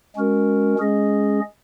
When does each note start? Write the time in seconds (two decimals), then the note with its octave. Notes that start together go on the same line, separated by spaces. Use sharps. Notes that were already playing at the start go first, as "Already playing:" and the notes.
0.16 G#3 C#4 F#4 A#4
0.79 G#3 C#4 G#4 D#5